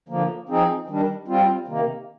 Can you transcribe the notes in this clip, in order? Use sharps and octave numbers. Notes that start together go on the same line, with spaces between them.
D3 F3 A#3
F3 C4 D#4 G#4
D#3 G3 D4
G3 C4 F4
C3 D#3 A#3